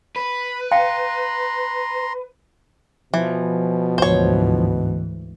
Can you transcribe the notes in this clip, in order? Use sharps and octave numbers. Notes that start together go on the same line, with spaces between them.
B4 B5
F5 G5 A#5 C6
B2 E3 F3
D2 G#2 E3 C5 C#5